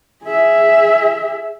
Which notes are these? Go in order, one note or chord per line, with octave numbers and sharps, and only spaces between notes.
G#4 E5